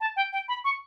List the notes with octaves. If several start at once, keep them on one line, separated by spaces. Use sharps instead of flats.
A5
G5
G5
B5
C#6